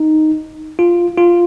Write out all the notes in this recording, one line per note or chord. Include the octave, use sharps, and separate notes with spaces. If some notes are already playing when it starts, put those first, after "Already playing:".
Already playing: D#4
F4
F4